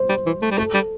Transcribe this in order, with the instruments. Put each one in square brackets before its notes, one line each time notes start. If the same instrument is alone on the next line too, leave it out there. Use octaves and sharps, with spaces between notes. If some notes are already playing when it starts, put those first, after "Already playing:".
Already playing: [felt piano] C5
[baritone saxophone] G3
E3
A3
G3
[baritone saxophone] A3 [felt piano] A4
[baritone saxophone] G3